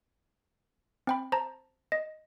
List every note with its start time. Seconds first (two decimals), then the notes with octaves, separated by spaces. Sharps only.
1.07 C4 G5 B5
1.32 C5 A5 A#5
1.92 D#5